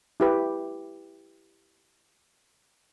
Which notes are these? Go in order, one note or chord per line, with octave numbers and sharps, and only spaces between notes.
E4 G4 B4